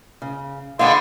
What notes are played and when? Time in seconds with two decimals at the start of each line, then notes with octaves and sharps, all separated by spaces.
0.22 C#3
0.79 D3 B3 G#4 D#5 F5 C6